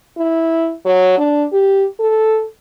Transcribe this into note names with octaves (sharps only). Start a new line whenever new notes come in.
E4
F#3
D4
G4
A4